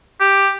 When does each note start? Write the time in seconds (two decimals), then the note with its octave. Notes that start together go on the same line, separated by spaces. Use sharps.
0.20 G4